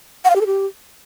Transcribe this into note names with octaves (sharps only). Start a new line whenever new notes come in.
F#5
F5
G4
A4
G4